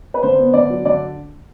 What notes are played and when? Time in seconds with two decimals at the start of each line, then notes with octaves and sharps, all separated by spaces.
0.14 B4
0.23 D3 C5
0.38 B3
0.53 D3 D5
0.70 F#3
0.85 D3 D5